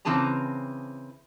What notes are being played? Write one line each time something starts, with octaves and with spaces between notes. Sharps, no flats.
C#3 E3 C4 G#4 A5 A#5